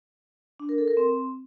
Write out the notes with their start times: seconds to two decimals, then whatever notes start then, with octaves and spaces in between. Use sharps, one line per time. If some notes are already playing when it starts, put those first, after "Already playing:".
0.60 D4
0.69 A#4
0.78 A4
0.88 A#4
0.97 C4